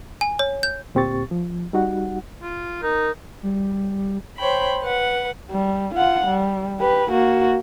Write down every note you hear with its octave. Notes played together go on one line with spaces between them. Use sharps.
G#5
C#5
G6
D2 A#2 C4 G4 C#6 A6
F3
G3 D#4 F#4 F#5
F4
D#4 A#4
G3
C5 C#5 G5 B5
B4 F#5
G3
F4 F#5
G3
G4 B4
A#3 F#4